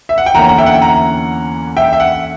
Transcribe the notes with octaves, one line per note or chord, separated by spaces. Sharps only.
E5
F#5
G5
E2 D3 A#3 C#4 F#5 A#5
F#5
E5 G5
F#5
G5
F#5 A#5
E5 G5
E5
F#5